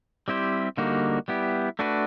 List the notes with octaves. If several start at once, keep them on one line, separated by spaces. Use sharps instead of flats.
G3 C4 E4 G4 C5
D3 G3 A#3 D#4 F#4
G3 B3 E4 G4
A3 D4 F#4 B4